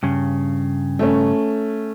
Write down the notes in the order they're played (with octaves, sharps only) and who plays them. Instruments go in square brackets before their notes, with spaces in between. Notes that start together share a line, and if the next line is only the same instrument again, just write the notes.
[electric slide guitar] G2 C#3
[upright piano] A3 C#4